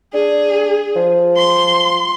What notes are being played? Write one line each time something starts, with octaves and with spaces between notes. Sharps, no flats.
D4 G#4
F3
C6